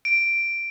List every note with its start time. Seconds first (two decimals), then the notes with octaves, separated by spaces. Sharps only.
0.05 D7